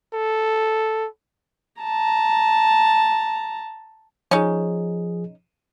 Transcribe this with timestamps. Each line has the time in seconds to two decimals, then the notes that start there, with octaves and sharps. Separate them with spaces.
0.14 A4
1.81 A5 A#5
4.31 F3 C#4 D#4 G#4